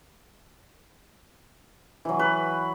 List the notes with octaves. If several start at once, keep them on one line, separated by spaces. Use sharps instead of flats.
E3 F#3
B4